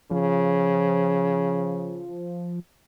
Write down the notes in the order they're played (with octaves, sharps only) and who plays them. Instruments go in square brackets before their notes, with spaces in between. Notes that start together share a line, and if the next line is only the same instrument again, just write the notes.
[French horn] C#3 [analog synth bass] F3